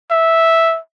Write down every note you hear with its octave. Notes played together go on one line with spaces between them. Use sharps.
E5